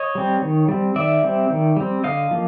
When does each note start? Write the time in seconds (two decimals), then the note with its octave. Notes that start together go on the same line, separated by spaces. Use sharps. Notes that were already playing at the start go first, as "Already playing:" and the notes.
Already playing: C#5 D#5
0.15 G3 C4
0.42 D#3
0.68 G3 C4
0.96 D#3 D5 E5
1.23 G3 C4
1.50 D#3
1.77 G3 C4
2.04 D3 D#5 F5
2.31 F3 A#3